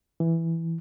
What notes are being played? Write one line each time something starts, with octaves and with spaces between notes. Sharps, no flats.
E3